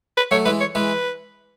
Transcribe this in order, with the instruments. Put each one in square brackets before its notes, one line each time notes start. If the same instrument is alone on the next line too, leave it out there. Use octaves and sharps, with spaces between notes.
[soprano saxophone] B4
[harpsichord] F#3 A3 [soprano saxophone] C#5
[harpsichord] E3 G#3 [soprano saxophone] B4
[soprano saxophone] C#5
[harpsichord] E3 G#3 [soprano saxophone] B4